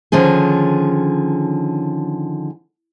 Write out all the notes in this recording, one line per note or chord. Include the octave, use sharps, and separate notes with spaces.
D3 D#3 F3 C#4 G#4